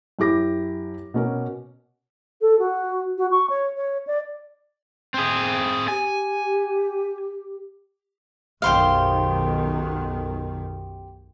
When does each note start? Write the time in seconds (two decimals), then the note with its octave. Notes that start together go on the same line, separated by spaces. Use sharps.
0.19 F#2 E4 G4 D6 A#6
1.14 B2 C#4 A#4
2.41 A4
2.59 F#4
3.18 F#4
3.31 C#6
3.50 C#5
3.77 C#5
4.07 D5
5.14 C4 G#4
5.88 G4 G#5
8.62 B1 F#2 D#3 G4 C5 F5